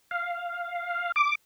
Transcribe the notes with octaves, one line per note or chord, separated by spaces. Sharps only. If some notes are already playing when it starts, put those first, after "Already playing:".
F5
D6